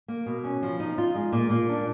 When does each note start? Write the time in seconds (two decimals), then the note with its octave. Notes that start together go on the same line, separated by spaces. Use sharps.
0.08 A#3
0.26 B2
0.44 C#4
0.63 F3
0.80 D#4
0.98 F4
1.15 G#3
1.32 A#2
1.50 A#2
1.69 D4